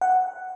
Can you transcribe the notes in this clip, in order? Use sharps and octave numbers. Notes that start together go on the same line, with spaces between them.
F#5